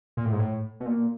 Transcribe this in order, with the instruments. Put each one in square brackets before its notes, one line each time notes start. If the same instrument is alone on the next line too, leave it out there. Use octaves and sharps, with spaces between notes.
[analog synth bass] A#2
A2
G#2
A2
B2
A#2